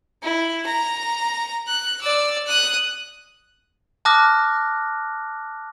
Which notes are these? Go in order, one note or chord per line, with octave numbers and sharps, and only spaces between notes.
E4
A#5
F#6
D5 E6
D#6 F#6
A5 D6 D#6 F6 F#6 A#6